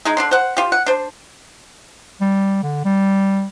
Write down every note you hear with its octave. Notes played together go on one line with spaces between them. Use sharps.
G#3 D#4 G#4
D3 D4 C6
C5 F#5
F4 G4
F#5
D4 C5
G3
D3
G3